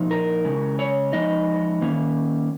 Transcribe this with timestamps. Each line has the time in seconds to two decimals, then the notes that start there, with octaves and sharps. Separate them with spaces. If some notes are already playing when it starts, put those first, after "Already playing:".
Already playing: A#2 F3 D#4
0.11 A#4
0.44 C#3 G#3 C#4
0.79 C#5
1.13 F3 G#3 B3 D#4 D#5
1.82 D#3 A#3 C#4